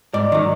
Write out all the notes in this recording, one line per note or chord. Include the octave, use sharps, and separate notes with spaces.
G#2 D5
D#3 F#3